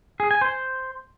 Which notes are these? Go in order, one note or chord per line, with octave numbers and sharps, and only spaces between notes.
G#4
G#5
C5